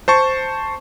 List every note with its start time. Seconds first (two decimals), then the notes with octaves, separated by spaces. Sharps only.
0.08 C5 A5 C#6